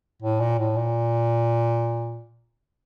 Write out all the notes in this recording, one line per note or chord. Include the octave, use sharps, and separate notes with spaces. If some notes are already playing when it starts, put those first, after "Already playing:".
A2
A#2
A2
A#2